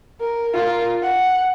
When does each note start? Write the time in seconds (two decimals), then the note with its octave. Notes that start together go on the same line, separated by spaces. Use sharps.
0.20 A#4
0.54 F4 A#4
1.02 F#5